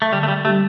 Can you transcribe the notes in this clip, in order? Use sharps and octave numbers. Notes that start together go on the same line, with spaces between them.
A3
D3 G3
A3
G3
G3 A3 D4 G4